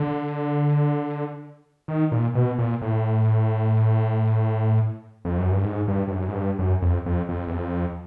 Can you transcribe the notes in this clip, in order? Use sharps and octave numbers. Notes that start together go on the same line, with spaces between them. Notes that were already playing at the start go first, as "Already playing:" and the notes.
Already playing: D3
D#3
A#2
B2
A#2
A2
F2
F#2
G2
G#2
G2
G2
F#2
G#2
G2
F#2
F2
F2
F2
E2
F2